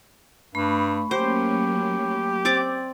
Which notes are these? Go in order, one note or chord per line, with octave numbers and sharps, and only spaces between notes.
G2 A3 B5 C#6
F#3 A#3 C#4 G4 C5
C4 D5 D6